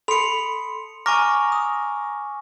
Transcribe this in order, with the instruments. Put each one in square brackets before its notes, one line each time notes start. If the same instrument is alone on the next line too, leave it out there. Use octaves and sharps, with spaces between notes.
[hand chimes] A4 B5 C6 [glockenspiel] C#7 F7
[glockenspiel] G#5 C#6 A#6 [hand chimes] A#5 D6 F6
[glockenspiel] D#6